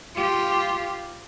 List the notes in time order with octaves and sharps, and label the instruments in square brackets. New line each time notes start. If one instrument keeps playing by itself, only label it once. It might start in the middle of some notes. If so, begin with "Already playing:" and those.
[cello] F4 G4